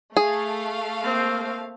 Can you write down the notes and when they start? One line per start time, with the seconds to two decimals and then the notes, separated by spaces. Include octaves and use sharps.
0.17 A3 G#4 F5
1.02 A#3 C4